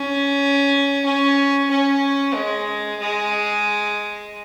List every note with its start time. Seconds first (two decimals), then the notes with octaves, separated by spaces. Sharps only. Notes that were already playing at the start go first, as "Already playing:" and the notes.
Already playing: C#4
1.05 C#4
1.71 C#4
2.34 G#3
3.00 G#3